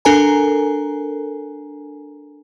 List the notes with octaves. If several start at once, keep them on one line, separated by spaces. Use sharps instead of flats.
D4 A4 A#4 G#5 A#5